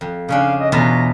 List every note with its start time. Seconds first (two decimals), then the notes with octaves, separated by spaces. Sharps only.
0.01 F2
0.29 C#3 C#4 D4 F5
0.59 D#5
0.72 E2 B2 F4 A#5